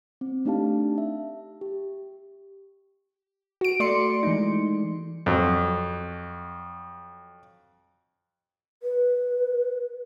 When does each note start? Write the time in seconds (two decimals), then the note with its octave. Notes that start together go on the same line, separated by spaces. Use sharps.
0.21 C4
0.45 A3 D4 D#4 G4 F5 A5
0.98 E5
1.61 G4
3.61 F#4 D7
3.80 A3 D5 C6 C#7
4.23 E3 G#3 D#4
5.26 F2 F#3
8.82 B4